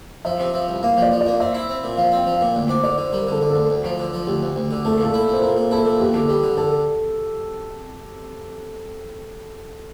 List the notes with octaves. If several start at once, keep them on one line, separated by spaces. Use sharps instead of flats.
F3 E5
C3
F3
C2
A#3 F5
F3
D5
F3
D5
A#3
C4 E5
E4
C4
A#2
F3 F5
C4
G5
F3
F5
A#2
D2
D4 C5
D3 D5
D3 C5
G3 A#4
D3 A4
D3
A4
D2
D2
F3
D3
F3
D2 G4
D2
D2
D3
A3 A4
A#2
A4
E4
A#2
C5
A#2 A#4
A#2
E4 A4
A#2
E2 G4
D3 A4
G3 G4
D3
D3 A4